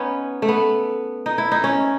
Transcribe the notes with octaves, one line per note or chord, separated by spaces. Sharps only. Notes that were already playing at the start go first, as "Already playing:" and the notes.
Already playing: B3 C#4 D#4
A3
B3
D#4
E4
D#4
C#4